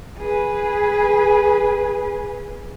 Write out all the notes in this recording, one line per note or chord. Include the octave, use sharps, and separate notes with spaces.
G#4 B4